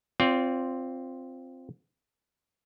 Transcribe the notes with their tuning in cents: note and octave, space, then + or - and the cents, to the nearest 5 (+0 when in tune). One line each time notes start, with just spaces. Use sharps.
C4 +0 F4 +0 D5 -35